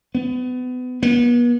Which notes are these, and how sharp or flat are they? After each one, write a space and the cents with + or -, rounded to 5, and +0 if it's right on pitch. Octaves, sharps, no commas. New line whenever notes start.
B3 +30
B3 -40